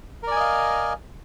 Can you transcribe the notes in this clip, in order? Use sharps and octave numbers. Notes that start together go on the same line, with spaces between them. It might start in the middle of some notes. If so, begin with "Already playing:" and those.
A#4 D5 D#5 F5 G#5